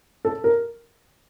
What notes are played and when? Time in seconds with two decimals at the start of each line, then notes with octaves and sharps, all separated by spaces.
0.25 A4
0.44 A#4